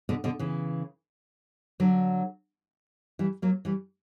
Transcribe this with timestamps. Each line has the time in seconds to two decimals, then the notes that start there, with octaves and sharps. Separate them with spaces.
0.09 B2 D3
0.24 B2 D3
0.39 C#3 E3
1.80 D3 F#3
3.19 E3 G3
3.42 F#3 A#3
3.65 E3 G3